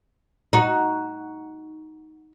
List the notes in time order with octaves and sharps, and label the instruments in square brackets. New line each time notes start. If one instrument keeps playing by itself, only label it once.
[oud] D#4 F#4